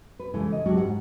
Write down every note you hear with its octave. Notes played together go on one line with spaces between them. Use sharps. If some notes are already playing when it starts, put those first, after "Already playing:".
B4
C#3 E3 G#3 E4 A4
D#5
F#3 G#3 C#4 D4 F#4 G4
G#2 D5 F#5